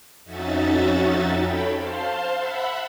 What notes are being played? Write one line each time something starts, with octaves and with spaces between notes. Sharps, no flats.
F2 C#4 D#4 F#4 E5 A6
A4 C#5 G5 B5
C5 F5 A5 C6
E5 F#5 B5